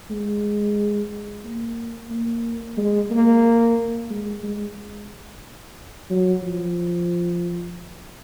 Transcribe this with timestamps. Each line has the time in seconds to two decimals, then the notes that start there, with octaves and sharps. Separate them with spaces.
0.10 G#3
1.44 A#3
2.10 A#3
2.77 G#3
3.11 A#3
4.10 G#3
4.43 G#3
6.10 F#3
6.43 F3